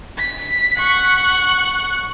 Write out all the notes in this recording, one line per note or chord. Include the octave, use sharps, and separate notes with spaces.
B6
F#5 C#6